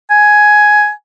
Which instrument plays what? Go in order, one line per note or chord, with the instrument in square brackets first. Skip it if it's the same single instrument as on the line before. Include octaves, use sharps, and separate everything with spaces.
[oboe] G#5